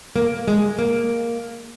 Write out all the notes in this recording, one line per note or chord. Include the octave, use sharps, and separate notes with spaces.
A#3
G#3
A#3